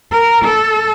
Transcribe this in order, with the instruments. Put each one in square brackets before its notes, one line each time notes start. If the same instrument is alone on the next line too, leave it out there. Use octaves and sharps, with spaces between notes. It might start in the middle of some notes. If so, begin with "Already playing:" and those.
[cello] A#4
A4